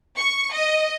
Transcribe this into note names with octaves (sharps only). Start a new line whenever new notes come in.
C#6
D#5